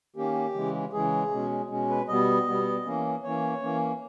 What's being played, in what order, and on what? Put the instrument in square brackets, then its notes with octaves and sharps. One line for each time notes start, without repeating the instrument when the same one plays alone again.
[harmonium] D#3 A#3 C#4 G4
C#3 E3 G#3
C#3 E3 G#3 G#4
B2 G#3 C#4
B2 G#3 C#4
B4
B2 G3 B3 D#5
B2 G3 B3
E3 A#3 C#4
E3 A#3 C#4 C#5
E3 A#3 C#4